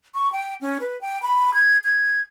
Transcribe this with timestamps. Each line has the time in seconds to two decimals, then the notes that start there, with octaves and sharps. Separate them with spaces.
0.15 C#6
0.32 G5
0.61 C#4
0.80 B4
1.01 G5
1.22 B5
1.54 G#6
1.84 G#6